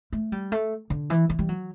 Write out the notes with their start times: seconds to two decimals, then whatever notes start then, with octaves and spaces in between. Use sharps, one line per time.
0.13 A3
0.32 G3
0.52 A3
0.90 D3
1.10 E3
1.29 E3
1.39 G3
1.49 F#3